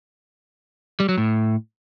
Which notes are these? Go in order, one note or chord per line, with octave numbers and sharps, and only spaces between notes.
G3
F#3
A2